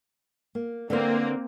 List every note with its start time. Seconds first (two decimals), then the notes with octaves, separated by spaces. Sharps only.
0.55 A#3
0.90 D3 A#3 C4 B4 C5